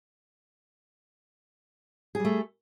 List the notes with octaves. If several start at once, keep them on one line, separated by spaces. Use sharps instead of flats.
G3 A3 G#4